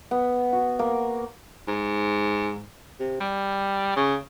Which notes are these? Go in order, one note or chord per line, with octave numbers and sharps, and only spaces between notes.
B3
F#4
A#3
G#2
C3
G3
C#3